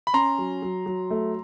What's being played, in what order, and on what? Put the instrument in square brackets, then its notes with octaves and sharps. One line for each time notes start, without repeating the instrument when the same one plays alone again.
[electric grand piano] B5
[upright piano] C#4 [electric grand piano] A#5 C6
[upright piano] F#3
F#3
F#3
A3